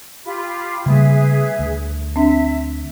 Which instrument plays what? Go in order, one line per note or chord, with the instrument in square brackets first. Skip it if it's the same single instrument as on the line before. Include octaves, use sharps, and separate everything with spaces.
[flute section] F4 G4 B5
[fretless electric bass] C#3 A3 A#3 [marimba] G3 [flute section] G#4 B4 E5
[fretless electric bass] D2
[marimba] C4 D4 [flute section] E5